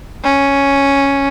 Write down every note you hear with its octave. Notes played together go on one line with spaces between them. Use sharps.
C#4